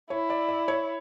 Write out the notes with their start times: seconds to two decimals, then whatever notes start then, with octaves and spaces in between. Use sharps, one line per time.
0.10 E4 C#5
0.30 D5
0.49 D5
0.68 C#5